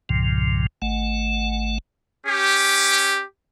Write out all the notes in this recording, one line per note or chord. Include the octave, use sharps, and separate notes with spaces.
C2 G2 A#2 C#3 F3
G#1 A3 F#5
C#4 G4